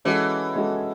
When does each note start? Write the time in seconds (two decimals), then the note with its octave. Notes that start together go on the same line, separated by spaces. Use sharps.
0.05 E3 G#3 C#4 F#4 A4
0.55 G#3 C#4 F#4 A4